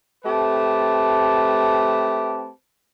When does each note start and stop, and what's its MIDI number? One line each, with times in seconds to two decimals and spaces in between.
0.24 2.50 57
0.24 2.50 60
0.24 2.50 67
0.24 2.50 71
0.24 2.50 81